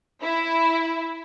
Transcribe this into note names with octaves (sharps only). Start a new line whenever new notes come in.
E4